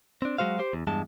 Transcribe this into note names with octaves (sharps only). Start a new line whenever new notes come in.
C4 D4
F#3 G#3 F#4 C5 F5
G4 C5
E2
E2 G2 G#3 A5